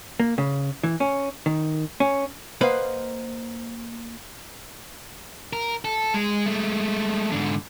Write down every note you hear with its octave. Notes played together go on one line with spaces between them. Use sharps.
A#3
C#3
E3
C#4
D#3
C#4
A#3 B4 C5 D#5 F5 F#5
A#4
A4
G#3
G#3 A3
G#2 D3